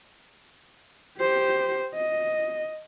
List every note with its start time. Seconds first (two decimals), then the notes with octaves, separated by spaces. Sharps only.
1.18 G4 C5
1.95 D#5